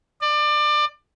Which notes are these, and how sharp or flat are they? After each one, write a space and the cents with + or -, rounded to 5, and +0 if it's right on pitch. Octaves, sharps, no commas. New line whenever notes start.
D5 +25